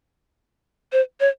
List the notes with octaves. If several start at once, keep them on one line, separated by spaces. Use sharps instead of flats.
C5
C#5